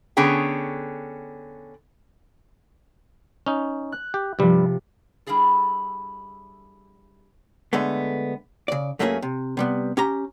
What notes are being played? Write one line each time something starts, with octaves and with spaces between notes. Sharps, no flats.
D3 B3 C#4 G#4 G5
C#4 D#4
F#6
G4
G2 C3 F3 G3
G3 D4 E4 G#4 A4
D3 G#3 A3 B3
C#3 D5
F#2 A3 A#3 C#4 F4 G#4
C3
C3 G3 B3
C#4 G4 A#5